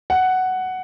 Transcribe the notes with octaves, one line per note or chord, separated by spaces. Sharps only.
F#5